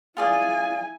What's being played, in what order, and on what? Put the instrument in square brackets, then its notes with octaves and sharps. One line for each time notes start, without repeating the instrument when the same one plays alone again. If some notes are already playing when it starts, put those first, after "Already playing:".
[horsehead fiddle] E4 G#5 [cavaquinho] F4 G#4 D5